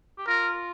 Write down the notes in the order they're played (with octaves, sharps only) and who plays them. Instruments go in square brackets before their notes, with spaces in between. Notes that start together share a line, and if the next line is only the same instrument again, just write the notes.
[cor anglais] G4
[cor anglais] F4 [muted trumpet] A#4